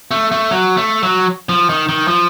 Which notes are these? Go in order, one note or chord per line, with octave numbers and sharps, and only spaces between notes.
A3
A3
F#3
A3
F#3
F3
D#3
D#3
F3